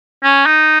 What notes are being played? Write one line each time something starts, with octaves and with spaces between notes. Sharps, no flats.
C#4
D#4